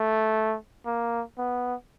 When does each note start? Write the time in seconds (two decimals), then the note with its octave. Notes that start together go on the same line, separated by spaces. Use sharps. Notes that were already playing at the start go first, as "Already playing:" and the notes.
Already playing: A3
0.86 A#3
1.38 B3